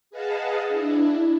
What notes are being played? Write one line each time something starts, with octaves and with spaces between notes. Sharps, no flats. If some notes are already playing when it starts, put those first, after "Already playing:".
G#4 B4 D#5 F5 F#5 A5
D4 E4